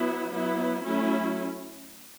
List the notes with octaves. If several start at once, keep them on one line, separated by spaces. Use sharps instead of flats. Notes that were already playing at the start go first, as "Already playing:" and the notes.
Already playing: F#3 B3 E4
F#3 B3 E4
F#3 A3 C#4 E4